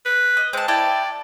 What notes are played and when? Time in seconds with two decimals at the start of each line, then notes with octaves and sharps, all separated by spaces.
0.05 B4
0.37 D#5
0.53 G#3 C4 A5
0.68 E4 D5 G5 A5